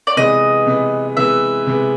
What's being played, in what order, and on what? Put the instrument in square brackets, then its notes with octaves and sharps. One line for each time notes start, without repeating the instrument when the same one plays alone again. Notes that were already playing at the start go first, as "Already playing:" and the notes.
[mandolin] D5
[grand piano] C3 E3 G#3 B3 [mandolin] D#5
[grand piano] C3 E3 G#3 B3
[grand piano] C3 E3 G#3 B3 [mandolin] E5
[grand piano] C3 E3 G#3 B3